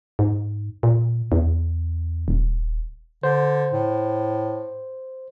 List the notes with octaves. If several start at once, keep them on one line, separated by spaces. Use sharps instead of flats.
G#2
A#2
E2
D#1
D3 C5
A2